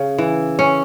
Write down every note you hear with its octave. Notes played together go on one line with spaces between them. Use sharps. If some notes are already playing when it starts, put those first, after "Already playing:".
Already playing: C#3
E3
C#4